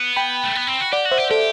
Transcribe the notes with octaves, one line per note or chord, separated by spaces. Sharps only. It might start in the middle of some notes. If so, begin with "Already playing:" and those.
Already playing: B3
G5 B5
A3
B3
C4
F#4
G4 D5 F#5
F#4
C5 E5
G4
G4 A4 C5